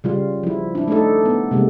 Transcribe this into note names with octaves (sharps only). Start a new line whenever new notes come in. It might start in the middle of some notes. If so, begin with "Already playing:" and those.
C#3 G3 F4
F3 E4
D4 E4
A3 D4 D#4 A4
B3
C3 G#3 A#3